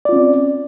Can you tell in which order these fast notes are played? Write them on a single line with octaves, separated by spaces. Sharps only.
D5 F4 C#4 C4